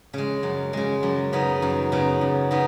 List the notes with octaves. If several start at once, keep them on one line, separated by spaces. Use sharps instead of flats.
C#3 G#3
F#2
C#3 G#3
F#2
C#3 B3 D#4
F#2
C#3 B3 D#4
F#2
C#3 B3 D#4